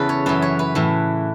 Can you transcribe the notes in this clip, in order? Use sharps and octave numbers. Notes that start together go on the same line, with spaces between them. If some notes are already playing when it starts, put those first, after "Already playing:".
Already playing: E2 C#3 E3 A4 B4
C#5
F#2 E3 B4
C#5
B4
A2 E3